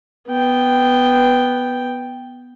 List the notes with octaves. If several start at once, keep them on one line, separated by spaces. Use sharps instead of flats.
B3 G5